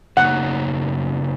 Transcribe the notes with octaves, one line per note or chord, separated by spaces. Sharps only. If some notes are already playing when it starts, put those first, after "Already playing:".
F#2 C#3 F#3 A#3 D#4 F#5